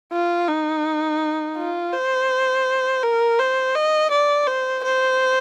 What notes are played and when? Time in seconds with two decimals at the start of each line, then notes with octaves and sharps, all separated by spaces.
0.12 F4
0.48 D#4
1.57 F4
1.93 C5
3.03 A#4
3.39 C5
3.75 D#5
4.11 D5
4.47 C5
4.84 C5